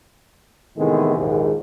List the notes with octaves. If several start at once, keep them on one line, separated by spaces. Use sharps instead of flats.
A2 C3 D#3 E3 G#3 B3
A#1 D#2 G#2